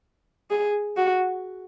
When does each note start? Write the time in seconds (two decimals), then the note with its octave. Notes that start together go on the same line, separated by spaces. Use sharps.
0.50 G#4
0.97 F#4